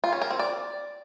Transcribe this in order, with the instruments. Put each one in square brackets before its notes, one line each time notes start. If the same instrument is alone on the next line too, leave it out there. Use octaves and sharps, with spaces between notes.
[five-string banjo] F4
C#4
A#4
C4
D5